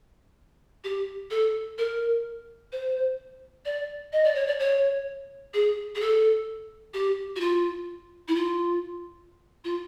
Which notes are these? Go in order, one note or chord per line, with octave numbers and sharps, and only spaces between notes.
G4
A4
A#4
C5
D5
D#5
D5
C#5
D5
C#5
G#4
G#4
A4
G4
F#4
F4
E4
F4
F4